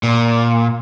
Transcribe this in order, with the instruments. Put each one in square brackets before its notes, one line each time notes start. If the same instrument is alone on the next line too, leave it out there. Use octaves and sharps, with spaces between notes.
[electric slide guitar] A#2